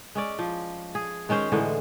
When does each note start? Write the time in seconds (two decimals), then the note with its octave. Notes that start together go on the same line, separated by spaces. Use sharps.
0.15 G#3 C#4 D5
0.39 F3
0.95 G#4
1.29 D#3 G#3 C#4 C5
1.52 A2 D3 E3 G#3